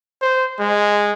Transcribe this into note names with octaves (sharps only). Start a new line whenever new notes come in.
C5
G#3